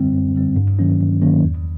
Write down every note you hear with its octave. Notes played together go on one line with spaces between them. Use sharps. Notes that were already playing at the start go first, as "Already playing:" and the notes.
Already playing: F#2 D3 G3 C4
F#2
D3 G3 C4
G2
D#3 F#3 A#3 C#4
G2
D#3 F#3 A#3 C#4
E2